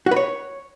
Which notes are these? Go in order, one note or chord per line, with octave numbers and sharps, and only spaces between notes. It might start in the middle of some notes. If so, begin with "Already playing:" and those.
F#4
B4
C#5